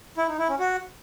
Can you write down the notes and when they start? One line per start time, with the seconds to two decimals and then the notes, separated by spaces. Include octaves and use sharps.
0.17 E4
0.28 D#4
0.38 E4
0.49 C#4
0.59 F#4